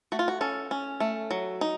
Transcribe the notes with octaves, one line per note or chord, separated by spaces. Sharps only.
A3 F#4
F4
F#4
C#4 A4
C#4
A3
F#3
D#4